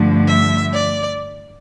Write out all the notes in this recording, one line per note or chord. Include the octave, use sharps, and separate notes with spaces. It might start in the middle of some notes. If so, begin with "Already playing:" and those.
Already playing: G2 D3 F3 A3
E5
D5